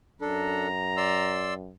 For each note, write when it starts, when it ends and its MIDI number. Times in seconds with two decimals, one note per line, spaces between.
0.21 1.73 42
0.21 0.68 62
0.21 0.68 69
0.21 1.40 82
0.97 1.54 74
0.97 1.54 84
0.97 1.54 88